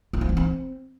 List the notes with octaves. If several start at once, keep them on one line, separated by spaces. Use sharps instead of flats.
F4
C4
E3
C4